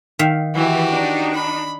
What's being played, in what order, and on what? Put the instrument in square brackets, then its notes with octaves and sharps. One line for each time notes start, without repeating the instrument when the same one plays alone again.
[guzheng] D#3 E5 F5
[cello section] E3 [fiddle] F#4 G4
[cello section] D4 D#4
[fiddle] B5